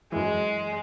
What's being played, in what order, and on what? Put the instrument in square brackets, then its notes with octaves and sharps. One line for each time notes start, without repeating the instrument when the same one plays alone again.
[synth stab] F#2 E3 [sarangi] G#3